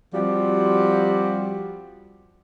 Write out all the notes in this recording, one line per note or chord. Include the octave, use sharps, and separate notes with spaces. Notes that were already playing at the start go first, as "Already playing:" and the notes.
F3 G3 C4 F#4 G4